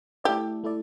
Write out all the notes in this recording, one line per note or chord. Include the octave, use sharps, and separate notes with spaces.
A3 E4 G4 A4 D5
A3 E4 A4 D5